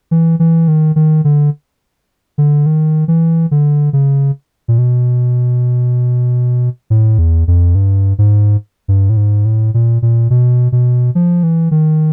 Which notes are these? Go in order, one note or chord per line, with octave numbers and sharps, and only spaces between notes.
E3
E3
D#3
D#3
D3
D3
D#3
E3
D3
C#3
A#2
B2
A2
E2
F2
G2
G#2
G2
A2
G#2
A2
A#2
A#2
B2
B2
F3
E3
D#3